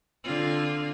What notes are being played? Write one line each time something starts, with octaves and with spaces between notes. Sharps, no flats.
D3 C4 F4